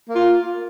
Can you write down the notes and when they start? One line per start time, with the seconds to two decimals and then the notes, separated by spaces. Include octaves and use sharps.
0.09 A#3
0.14 F4